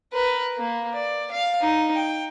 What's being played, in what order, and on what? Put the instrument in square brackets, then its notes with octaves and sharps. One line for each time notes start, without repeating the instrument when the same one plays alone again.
[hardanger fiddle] A#4 B4
A#3
D5
F5
D#4
G5